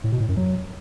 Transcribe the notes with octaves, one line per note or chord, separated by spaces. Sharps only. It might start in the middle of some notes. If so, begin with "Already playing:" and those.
A2
B2
A2
F#2
F#3